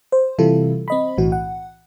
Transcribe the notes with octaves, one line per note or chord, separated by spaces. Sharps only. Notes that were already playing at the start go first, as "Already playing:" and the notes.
C5
C3 E3 G3 E4 F4 A4
C4 D#5 B5
B1 A2 E3 F#4
F#5